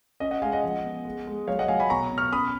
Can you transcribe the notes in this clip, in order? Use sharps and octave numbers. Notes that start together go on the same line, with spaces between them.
C#4 D#5
D#5 F#5
G#3 F5 G#5
D#5 F#5
F3
B3
G#3
G#3
F#3 C#5 F5
D#5 F#5
F#3 F5 G#5
G#5 B5
B2 A#5 C#6
B2
C#6 F6
C#4 B5 D#6